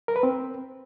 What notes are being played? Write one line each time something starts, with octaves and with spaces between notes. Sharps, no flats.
A#4
B4
C4